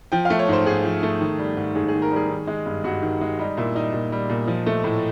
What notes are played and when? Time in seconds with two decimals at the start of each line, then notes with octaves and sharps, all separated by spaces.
0.12 F3 G5
0.25 A3 F5
0.39 C#5
0.48 G#2 C5
0.66 G#2 G#4
0.84 F3
1.03 A3
1.20 D#3
1.39 G3
1.57 G#2
1.75 G#2 G#4
1.88 G#4
1.94 D#3
2.02 A#4
2.11 G3 G#4
2.30 D#3
2.47 G#3
2.66 G2
2.84 G2 F#4
3.02 D#3
3.21 G#3
3.39 G3 D#4
3.57 A#2 E4
3.75 G3 D#4
3.94 A#2
4.12 G3
4.30 A#2
4.47 F3
4.66 A3
4.84 A2